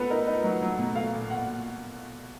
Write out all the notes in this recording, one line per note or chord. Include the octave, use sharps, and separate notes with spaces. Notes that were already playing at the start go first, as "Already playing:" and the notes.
Already playing: B3 A4 B4
D#4 A#4
D#4 B4
F#3
F#3
B2
A3 F5
A#2
A#2 F#5